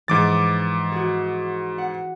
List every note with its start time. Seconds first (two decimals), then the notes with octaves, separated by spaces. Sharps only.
0.08 G#2 E3 F3 D6 A6
0.92 F#4 G#4
1.78 F#5